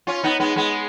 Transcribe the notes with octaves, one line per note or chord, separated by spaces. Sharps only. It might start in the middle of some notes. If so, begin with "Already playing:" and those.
C#4 F4
B3 D#4
G#3 B3
G#3 B3